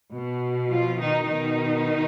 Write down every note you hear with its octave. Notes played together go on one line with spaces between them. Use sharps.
B2
F3 F4
D#3 D#4
B2 D#3 D#4